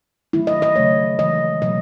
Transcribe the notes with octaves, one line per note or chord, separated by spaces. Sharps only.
D#3 F#3 A3 E4
D#5
D#5
C#3 F#3 A3 C#5
C#3 E3 G#3 D#5
B2 F#3 A3 D#5